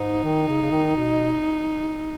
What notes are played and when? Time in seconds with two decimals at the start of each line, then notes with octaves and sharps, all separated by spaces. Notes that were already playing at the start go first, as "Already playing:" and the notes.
Already playing: G#2 D#4
0.24 D#3
0.48 C#3
0.61 C#3
0.71 D#3
0.96 B2